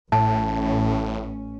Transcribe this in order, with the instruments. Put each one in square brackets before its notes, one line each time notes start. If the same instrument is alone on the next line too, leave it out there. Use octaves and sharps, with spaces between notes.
[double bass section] A1 C#4 [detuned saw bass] A2 [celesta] A5